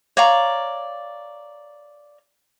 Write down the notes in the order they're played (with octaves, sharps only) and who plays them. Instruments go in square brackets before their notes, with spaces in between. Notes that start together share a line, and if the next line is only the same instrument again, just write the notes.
[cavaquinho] C#5 D5 F5 A#5